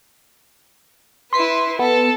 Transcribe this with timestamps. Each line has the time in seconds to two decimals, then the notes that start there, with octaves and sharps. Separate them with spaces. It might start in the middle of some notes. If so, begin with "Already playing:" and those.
1.33 E4 B4 C6 B6 C7
1.79 B3 A4